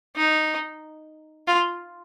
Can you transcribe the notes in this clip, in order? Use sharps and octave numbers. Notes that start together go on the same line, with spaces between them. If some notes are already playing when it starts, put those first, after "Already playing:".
D#4
F4